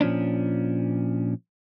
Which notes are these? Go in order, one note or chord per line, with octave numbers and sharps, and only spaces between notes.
A#2 F3 C#4 D4